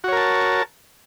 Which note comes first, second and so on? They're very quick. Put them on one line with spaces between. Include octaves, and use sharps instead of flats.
F#4 C#5 A#4 A5